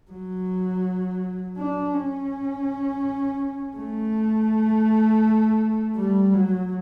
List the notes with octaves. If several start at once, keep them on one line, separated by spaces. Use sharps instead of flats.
F#3
D4
C#4
A3
G3
F#3